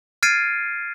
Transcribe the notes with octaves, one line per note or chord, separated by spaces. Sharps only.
F6 G#6 A6 C7 D7 D#7